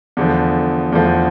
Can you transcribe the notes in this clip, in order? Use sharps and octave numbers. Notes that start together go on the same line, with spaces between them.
E2 D3 F3 A3
E2 D3 F3 A3